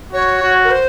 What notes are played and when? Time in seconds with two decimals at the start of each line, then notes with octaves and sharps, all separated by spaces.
0.12 F#4 C#5
0.42 F#4
0.65 A#4
0.71 C5